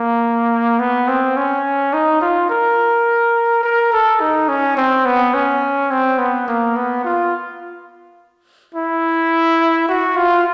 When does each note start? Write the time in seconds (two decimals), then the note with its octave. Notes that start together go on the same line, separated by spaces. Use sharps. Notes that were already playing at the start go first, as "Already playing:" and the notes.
Already playing: A#3
0.79 B3
1.08 C4
1.37 C#4
1.94 D#4
2.22 F4
2.50 A#4
3.63 A#4
3.92 A4
4.20 D#4
4.49 C#4
4.77 C4
5.06 B3
5.34 C#4
5.91 C4
6.18 B3
6.48 A#3
6.76 B3
7.05 F4
8.75 E4
9.89 F#4
10.17 F4